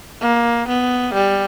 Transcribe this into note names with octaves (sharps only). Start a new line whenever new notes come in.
A#3
B3
G3